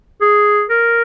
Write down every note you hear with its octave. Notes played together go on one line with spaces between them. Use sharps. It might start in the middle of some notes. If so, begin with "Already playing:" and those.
G#4
A#4